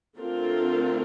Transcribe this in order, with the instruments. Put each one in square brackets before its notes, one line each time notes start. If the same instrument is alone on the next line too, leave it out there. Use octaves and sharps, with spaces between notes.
[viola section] D3 A3 C4 F4 A#4